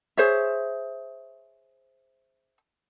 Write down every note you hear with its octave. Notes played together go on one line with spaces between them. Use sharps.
G#4 C5 C#5 E5